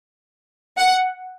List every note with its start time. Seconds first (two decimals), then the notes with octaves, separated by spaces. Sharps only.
0.78 F#5